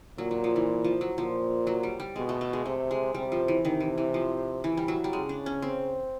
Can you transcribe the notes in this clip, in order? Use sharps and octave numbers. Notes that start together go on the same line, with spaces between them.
A#2 F#3
F#3
F3
E3
F3
F#3
A#2 F3
F#3
G3
G3
B2 G#3
A3
A3
G#3
C3 A3
G#3
C3 G3
F3
E3
C3 D#3
E3
E3
F3
E3
G3
F#3
G3
C#3 G#3
D4
C#4
C4